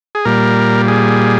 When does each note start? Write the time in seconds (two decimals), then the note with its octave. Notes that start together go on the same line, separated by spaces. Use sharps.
0.15 G#4
0.25 A#2 G3 A#4
0.88 G#4